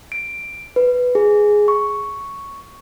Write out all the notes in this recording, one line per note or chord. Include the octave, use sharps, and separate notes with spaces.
D7
B4
G#4
C#6